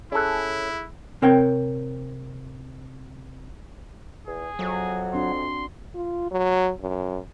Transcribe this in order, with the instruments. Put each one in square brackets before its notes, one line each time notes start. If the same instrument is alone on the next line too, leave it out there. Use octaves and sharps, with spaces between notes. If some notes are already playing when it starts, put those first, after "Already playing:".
[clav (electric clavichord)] C#4 A4 [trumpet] E4 [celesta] G#4 F#6
[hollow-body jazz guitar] C3 C4 A#4 C#5 G5
[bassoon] E2 [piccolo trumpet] G#4
[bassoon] F2 [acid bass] F#3
[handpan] C4 D4 F#4 [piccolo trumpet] C6
[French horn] F4
F#3
F#2